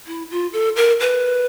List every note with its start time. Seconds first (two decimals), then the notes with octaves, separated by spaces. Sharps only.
0.07 E4
0.31 F4
0.53 A4
0.76 A#4
1.00 B4